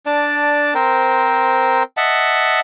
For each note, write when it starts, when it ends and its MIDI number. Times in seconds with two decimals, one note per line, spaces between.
0.06 0.74 62
0.06 0.74 74
0.06 0.74 81
0.75 1.83 60
0.75 1.83 70
0.75 1.83 72
1.97 2.60 75
1.97 2.60 76
1.97 2.60 78
1.97 2.60 81